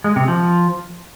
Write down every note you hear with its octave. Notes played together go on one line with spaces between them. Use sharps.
G#3
C3
F3